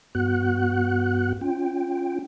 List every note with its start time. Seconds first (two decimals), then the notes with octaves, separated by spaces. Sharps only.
0.15 G2 B3 F#4 F#5 F#6
1.41 C#4 F4 G5